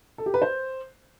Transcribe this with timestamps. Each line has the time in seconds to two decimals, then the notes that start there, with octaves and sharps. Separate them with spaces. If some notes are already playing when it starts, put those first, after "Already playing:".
0.18 A4
0.26 G4
0.34 B4
0.42 C5